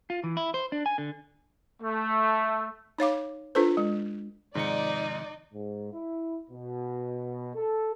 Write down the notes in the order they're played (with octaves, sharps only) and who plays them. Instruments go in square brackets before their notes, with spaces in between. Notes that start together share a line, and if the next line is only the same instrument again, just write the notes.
[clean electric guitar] F4
E3
E4
C5
D4
G#5
D3
[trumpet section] A3
[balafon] D#4 C#5 F5 D6
D4 F4 A4 B4 C5
G#3
[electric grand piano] G#2 C#7 [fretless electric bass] C3 D#3 F3 [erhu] D#4 [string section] D5
[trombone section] G#2
E4
B2
A4